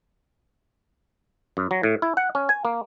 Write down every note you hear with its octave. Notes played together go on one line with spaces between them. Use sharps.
F#2
F#3
A2
E4
F#5
C#4
G#5
A#3